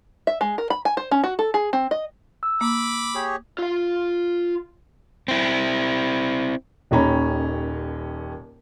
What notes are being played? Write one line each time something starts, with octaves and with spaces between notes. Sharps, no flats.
E5
G#3
A#4
B5
G#5
C5
C#4
F#4
A4
G#4
C4
D#5
E6
A#3 B5 D6
G4 G#4 C#5
F4 F5
C4 E4
D#1 D#2 D#3 C#4 A#5 B5